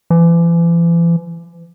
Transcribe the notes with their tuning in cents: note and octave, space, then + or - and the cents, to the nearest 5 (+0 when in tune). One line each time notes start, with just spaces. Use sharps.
E3 +40